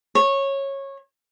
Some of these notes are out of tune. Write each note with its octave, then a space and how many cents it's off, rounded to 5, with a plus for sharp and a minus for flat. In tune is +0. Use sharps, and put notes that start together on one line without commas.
C#5 -15